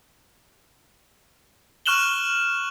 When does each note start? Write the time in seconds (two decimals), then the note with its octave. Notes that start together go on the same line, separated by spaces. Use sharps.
1.86 C#6 F6 F#6 E7 F#7 G7